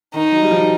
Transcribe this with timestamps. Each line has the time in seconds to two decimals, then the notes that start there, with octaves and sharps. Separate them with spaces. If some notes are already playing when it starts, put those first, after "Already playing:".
0.14 D#3 D#4
0.32 F#3
0.42 G3
0.51 F3